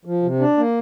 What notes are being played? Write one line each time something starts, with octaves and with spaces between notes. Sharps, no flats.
F3
C3
D4
A#3